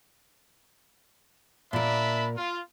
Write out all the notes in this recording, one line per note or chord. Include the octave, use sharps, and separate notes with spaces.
A#2 D4 A#4 E5 B5
F4